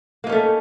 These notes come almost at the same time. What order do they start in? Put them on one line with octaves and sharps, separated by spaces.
A#3 D#4 C#4 A3